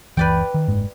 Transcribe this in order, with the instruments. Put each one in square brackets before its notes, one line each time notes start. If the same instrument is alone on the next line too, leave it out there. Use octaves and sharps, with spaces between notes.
[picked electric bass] F#1 C#2 E3 [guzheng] B4 D5 G5
[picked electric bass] D#3
F#1 G#2 G#3